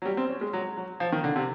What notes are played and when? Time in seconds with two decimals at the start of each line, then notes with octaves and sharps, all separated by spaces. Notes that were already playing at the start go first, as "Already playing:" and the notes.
0.02 F#3
0.06 G3
0.17 C4
0.30 C#4
0.41 G#3
0.53 F#3
0.77 F#3
1.00 F3
1.12 D#3
1.24 D3
1.36 C3